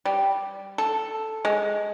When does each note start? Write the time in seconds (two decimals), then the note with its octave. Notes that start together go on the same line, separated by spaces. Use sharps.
0.05 G3
0.78 A4
1.45 G#3